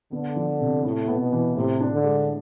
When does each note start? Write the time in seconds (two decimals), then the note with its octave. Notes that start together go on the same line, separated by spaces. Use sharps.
0.12 D3 B3
0.36 F3
0.61 C3
0.85 A2 E4
1.08 B3
1.20 B2
1.33 E3
1.56 A2 C3
1.81 D4
1.92 D3
2.04 G#3